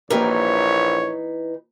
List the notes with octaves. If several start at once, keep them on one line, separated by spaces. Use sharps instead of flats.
A#1 E3 A#3 D#4 G4 A#4 C#5